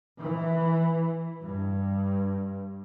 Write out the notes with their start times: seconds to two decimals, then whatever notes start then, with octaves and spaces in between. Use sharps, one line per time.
0.20 E3
1.43 G2